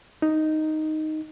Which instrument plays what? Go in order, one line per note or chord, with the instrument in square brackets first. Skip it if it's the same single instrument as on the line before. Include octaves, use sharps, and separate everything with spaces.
[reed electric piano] D#4